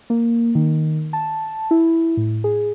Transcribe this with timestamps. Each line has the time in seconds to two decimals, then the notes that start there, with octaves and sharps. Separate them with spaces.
0.10 A#3
0.55 D#3
1.13 A5
1.71 E4
2.17 A2
2.44 G#4